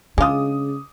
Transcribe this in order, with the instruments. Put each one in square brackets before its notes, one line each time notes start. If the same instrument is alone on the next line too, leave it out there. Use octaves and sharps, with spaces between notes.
[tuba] C#3 [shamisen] G#3 F4 [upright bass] D4 [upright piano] D6 D#6